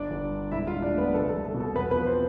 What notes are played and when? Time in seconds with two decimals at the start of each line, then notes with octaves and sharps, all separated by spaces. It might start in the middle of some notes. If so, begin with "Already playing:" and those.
Already playing: G1 D4 D5
0.11 G1
0.31 G2
0.52 E1 E4 E5
0.67 F4 F5
0.73 E1
0.82 D4 D5
0.93 D2
0.98 B3 B4
1.14 C2 A4
1.29 A4
1.34 C2
1.45 A4
1.54 B2
1.60 A4
1.76 E2 B3 B4
1.91 B3 B4
1.96 F3
2.06 C4 C5